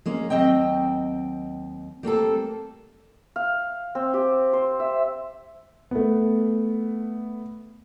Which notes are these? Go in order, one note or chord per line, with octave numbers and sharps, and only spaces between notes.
G#3 A#3 C#4
D#2 G#2 F#3 C4 D#5 G5
G3 A#3 C4 A4
F5
C4
G4
C5
E5
A3 B3